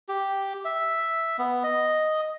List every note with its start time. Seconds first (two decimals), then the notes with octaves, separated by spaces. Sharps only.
0.08 G4
0.65 E5
1.38 B3
1.63 D#5